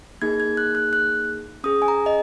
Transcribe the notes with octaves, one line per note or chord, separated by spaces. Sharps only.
A#3 D#4 G#4 G#6
G#6
F#6
F#6
F#6
C#4 G#4 D#6
G#5
A#5
D#5